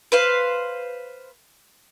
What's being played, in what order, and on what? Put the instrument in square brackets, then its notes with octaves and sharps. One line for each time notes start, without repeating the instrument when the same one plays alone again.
[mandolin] B4 C5 F5